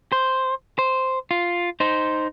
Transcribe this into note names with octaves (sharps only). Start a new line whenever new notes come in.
C5
C5
F4
D#4 C5